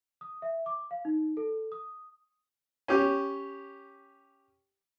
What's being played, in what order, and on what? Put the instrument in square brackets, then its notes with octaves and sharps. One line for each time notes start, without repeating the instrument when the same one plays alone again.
[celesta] D#6
E5
D6
F5
D#4
A4
D#6
[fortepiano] C#4 G4